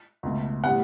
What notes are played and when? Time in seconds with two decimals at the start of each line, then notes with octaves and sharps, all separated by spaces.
0.23 C#2 B2 A3
0.64 A2 G3 B3 F#5